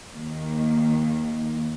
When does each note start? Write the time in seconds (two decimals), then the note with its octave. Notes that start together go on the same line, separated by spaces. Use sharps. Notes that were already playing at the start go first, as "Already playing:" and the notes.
0.14 D#2 D#3 A#3